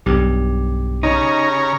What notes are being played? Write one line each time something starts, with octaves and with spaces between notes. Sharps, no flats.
B1 G2 G4
C#3 D#4 C#5 A#5